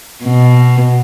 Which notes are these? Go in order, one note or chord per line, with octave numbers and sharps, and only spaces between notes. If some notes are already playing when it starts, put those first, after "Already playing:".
B2